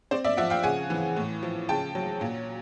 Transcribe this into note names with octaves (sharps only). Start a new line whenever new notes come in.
C4 C5 D5
D5 E5
F3 E5 F#5
F5 G5
C#3 F#5 G#5
E3
A2
F3
C#3 G5 A5
F#3
A#2